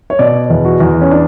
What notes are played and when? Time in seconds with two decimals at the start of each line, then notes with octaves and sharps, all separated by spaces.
0.10 C#5
0.19 B2 D5
0.50 E2
0.65 F#4
0.80 E2
1.01 C#4
1.11 D4